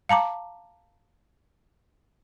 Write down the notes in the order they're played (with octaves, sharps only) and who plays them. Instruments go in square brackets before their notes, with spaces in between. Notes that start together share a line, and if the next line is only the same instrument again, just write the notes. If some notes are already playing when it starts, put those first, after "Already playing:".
[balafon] F5 A5 A#5 D6